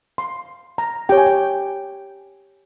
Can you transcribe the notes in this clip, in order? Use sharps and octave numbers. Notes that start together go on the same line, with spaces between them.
C6
A#5
G4 C#5 G5
G#5
G5